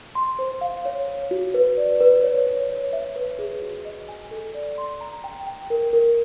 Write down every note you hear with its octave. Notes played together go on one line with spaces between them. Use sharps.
C6
C5
F5
C#5
C#5
F#4
B4
D5
B4
C#5
C#5
C#5
E5
B4
G#4
F#4
D#5
G#5
A4
D5
C6
A#5
G5
G5
A#4
A#4